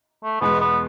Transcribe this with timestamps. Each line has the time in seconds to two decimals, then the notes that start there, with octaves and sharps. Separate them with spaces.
0.23 A3
0.41 E2 B2 G#3 B3
0.60 B3